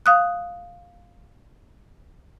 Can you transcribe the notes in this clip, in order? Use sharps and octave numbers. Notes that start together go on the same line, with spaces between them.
F5 D#6 F#6